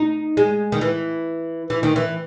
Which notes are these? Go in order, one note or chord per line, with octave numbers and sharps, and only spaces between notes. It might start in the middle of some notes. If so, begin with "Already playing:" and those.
Already playing: D#4
G#3
D#3
E3
E3
D#3
E3